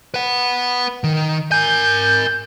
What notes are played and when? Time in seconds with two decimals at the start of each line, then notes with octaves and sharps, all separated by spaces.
0.14 B4 F#5
1.04 D#3
1.52 A#4 G#5 G6